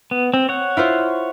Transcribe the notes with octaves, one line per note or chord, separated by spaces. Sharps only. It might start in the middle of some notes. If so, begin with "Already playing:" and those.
B3
C4
C#5 F#5
E4 F4 C5